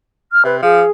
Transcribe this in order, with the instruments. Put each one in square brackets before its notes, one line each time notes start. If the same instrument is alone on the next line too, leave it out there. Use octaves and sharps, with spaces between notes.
[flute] F6
[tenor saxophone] C3 [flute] B4
[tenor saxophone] F3 [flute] G#4